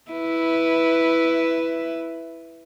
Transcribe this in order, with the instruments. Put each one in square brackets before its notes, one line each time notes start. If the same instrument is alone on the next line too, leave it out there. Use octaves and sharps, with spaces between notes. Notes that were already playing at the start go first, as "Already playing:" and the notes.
[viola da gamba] E4 B4